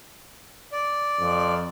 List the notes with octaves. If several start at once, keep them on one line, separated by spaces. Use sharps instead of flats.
D5
F2